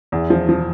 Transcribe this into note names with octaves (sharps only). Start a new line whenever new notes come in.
E2
F3
F3